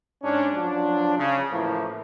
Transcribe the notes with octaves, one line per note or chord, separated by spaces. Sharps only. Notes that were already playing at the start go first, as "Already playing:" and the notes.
G#2 C#4 D4
F3 F#3 D4
C#3
A2 E3 F3 A#3